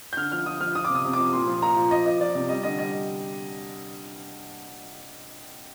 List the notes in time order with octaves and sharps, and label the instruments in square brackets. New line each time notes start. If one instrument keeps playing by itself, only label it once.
[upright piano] G6
D3 F6
F3 F6
F3 D#6
F3 F6
F3 D#6
D6
C3
D#6
C3
D6
F3
A#2 C6
F3
A#2 A#5
F3
F3 D#5
F3 D#5
F3 D5
C3
G3 D#5
D3 D#5
G3 D#5